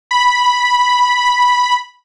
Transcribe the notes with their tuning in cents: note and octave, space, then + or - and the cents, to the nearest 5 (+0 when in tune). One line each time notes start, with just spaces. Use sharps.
B5 -5